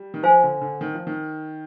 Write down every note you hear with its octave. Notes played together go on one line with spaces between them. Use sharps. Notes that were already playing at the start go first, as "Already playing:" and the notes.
Already playing: G3
D#3
F3 C5 F5 G#5
D3
D3
D#3
F3
D#3